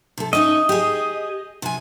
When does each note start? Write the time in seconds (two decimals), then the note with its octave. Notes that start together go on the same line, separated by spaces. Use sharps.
0.18 C3 A4
0.33 C#4 D#4 D#5 E5
0.69 G4 G#4
1.62 C3 G#5